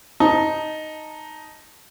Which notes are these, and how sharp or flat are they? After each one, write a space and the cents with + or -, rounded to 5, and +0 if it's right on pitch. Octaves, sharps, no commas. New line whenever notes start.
D#4 +0 A5 +0